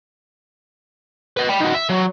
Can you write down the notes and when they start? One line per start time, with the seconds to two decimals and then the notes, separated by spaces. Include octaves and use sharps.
1.37 B4 D#5
1.49 G5 B5
1.60 D#3 F#4
1.74 E5
1.89 F#3